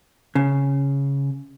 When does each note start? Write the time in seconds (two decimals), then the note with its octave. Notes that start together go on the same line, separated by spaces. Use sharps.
0.35 C#3